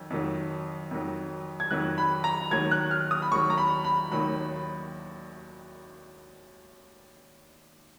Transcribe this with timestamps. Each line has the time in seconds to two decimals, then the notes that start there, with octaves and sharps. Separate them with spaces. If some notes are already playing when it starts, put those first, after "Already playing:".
Already playing: F2 D#3 F#3
0.10 F2 D#3 F#3
0.91 F2 D#3 F#3
1.60 G#6
1.71 F2 D#3 F#3 F#6
1.98 B5
2.24 A#5
2.51 D#2 D#3 F#3 G#6
2.71 F#6
2.91 F6
3.11 D#6
3.22 B5
3.32 D#2 D#3 F#3 C#6
3.50 A#5
3.58 B5
3.84 B5
4.11 D#2 D#3 F#3 B5